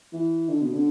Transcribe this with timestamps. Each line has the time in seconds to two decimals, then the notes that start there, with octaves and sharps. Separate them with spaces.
0.13 E3
0.49 D3
0.61 B2
0.74 D3